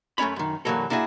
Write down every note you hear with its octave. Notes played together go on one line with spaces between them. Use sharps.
F#2 A3 C#4 C#5 B5
F#2 D#3
C2 G2 E3 F#3 A#3 A4
A#3 D4 E4 F#4 G#4